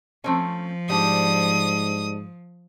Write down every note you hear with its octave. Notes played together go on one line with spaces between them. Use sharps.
F3 A3 C4 C#4
G#2 G3 D4 D#6